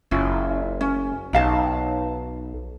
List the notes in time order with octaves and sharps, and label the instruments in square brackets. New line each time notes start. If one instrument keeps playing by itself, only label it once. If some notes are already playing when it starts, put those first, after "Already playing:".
[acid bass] F#1 [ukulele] C#4 E4 F4
[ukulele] C#4
[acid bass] B1 [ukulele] D#4 F5 A5